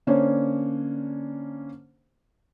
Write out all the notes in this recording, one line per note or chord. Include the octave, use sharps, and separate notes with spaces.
D3 A#3 C#4 D4 C5 C#5